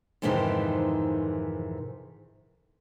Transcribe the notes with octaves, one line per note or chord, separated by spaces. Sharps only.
F2 G#2 C3 D#3 E3 D#4